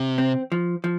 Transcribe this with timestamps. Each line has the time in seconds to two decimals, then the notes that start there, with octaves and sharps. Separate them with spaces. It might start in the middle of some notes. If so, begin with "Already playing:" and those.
Already playing: C3
0.18 C4
0.52 F3
0.84 F3